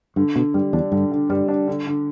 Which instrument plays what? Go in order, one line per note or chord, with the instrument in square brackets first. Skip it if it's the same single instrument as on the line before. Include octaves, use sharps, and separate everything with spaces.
[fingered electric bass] G2 [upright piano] D3
[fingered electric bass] B2 [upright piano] D3
[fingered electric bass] G2 [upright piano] G3
[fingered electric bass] E2 [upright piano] D4
[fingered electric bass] G2 [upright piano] D3
[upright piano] D3
[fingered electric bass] G2 [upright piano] G3
[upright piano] D4
D3
D3